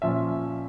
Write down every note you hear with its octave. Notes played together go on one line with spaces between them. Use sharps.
A#2 F3 C#4 E5